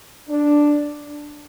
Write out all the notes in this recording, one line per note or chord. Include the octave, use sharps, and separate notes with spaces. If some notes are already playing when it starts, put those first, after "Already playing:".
D4